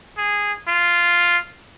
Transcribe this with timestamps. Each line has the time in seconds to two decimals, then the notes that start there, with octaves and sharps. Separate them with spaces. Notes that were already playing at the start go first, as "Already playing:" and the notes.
0.18 G#4
0.68 F4